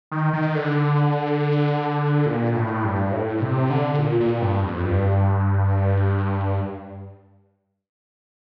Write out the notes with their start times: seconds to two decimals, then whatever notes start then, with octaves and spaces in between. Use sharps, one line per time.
0.11 D#3
0.33 D#3
0.55 D3
2.26 A#2
2.55 A2
2.84 G2
3.13 A2
3.41 C3
3.70 D3
3.99 A#2
4.20 A#2
4.42 G2
4.63 F2
4.85 G2